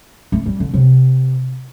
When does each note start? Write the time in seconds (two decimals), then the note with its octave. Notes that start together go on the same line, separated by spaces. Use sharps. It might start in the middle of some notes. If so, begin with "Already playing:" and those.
0.32 A3
0.46 G3
0.60 D3
0.74 C3